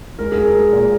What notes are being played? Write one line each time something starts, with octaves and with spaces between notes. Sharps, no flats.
G#3 A#4
G#3 G#4
A#4
G#3
A#2